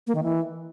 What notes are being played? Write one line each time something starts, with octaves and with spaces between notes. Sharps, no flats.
A#3
D#3
E3